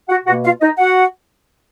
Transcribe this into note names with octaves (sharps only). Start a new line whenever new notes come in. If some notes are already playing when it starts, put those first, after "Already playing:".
F#4 F#5
B2 A#3 F#4 F#5
F4 F5
D#4 D#5
F#4 F#5